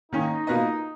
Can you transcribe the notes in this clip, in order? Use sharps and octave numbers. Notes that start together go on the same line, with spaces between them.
D#3 A#3 C#4 D#4
B2 A#3 F4 B4 D#5